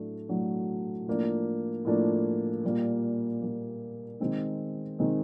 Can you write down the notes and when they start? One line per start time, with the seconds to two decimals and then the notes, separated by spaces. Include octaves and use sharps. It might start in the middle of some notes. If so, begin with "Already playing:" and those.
Already playing: A2 F#3 A3 D4
0.29 A2 F#3 A3 D4
1.07 A2 F3 A#3 D4
1.85 A2 F3 A#3 D4
2.64 A#2 G3 A#3
3.41 A#2 G3 A#3
4.20 D#3 G#3 C4 D#4
4.99 D#3 G#3 C4 D#4